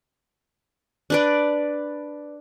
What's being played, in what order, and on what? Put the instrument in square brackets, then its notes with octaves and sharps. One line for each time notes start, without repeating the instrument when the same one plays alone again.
[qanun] D4 B4 D5